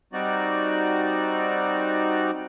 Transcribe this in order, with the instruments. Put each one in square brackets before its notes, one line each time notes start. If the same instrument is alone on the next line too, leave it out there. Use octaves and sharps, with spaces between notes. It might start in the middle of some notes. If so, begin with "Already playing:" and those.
[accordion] G3 C4 D#4 F#4 D5